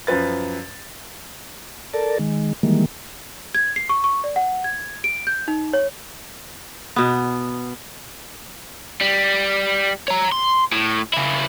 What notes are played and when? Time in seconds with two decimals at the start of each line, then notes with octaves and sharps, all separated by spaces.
0.07 F#2 F3 B4 A6
1.93 A4 A#4 D5 A5
2.19 D#3 G#3
2.63 D#3 E3 G3 G#3 A#3
3.55 G#6
3.76 C7
3.89 C#6
4.04 C#6
4.24 D5
4.36 F#5
4.64 G#6
5.04 D7
5.27 G6
5.48 D#4
5.73 C#5
6.96 B2 B3
9.01 G3
10.08 C#5 A#5
10.32 C6
10.72 A2
11.13 C#3 E4